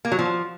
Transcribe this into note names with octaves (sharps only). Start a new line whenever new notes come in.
A#3
F#3
F3